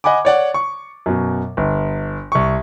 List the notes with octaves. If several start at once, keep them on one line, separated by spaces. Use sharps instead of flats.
D#5 F#5 G#5 B5 D6
C#5 D5 F#5
C#6
F#2 B2
G1
C2 C#6